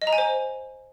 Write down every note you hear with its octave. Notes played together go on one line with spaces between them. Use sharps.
D#5
A#5
G#5
C5